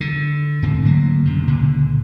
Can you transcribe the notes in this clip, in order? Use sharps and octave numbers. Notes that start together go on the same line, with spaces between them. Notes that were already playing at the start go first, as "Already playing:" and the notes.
D3
G#2 D3 C4
D3 F#3 A3 A#3
F#2 C3
C#2 A#2 D3